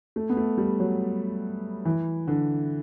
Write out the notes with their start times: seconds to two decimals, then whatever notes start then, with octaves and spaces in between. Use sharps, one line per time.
0.16 A3
0.30 B3
0.37 A3
0.58 G3
0.80 F#3
1.85 E3
2.28 D3